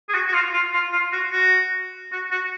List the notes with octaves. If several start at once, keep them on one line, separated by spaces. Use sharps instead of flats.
G#4
F#4
F#4
F4
F4
F4
F4
F#4
F#4
F#4
F#4